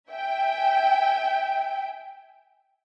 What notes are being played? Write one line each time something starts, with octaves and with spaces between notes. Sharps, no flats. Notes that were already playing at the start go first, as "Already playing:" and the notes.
E5 G5 G#5